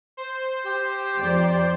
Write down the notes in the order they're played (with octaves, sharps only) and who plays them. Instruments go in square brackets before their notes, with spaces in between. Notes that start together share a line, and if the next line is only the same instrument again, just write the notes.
[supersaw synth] C5
[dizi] G4
[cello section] F2 D5